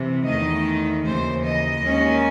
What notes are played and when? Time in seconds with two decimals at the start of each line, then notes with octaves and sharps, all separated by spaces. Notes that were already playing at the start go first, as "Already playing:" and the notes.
Already playing: C3 E3
0.26 E2 D#3 A3 D#5
1.06 D#2 C#3 E3 C5
1.46 D#5
1.85 D#2 D#3 G#3 C#4